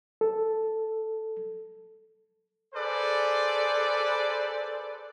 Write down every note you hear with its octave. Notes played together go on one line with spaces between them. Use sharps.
A4
G#4 A4 B4 C5 D5